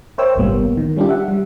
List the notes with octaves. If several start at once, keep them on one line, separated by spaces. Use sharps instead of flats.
A#4 C5 C#5 E5 G5 E6
G1 C2 A2 G3 A#3 B3
D#3
G3 C#4 D4 F4 G4
E5 F#5
G3